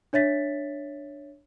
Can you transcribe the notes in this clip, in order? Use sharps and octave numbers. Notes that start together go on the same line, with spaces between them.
D4 C#5 E5 A6 B6